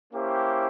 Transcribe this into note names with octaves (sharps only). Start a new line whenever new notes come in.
A#3 C#4 E4 G4 C5